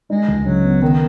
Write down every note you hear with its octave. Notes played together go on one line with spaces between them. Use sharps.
G#3 D#4
C#2
C#3 F#3
B3
D#3 B3